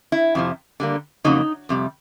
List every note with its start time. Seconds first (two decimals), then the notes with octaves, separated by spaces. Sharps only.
0.12 E4
0.35 F2 C3 F3
0.80 D3 G3 A#3
1.24 F2 C#3 F#3 A#3 D#4
1.69 F2 C3 G3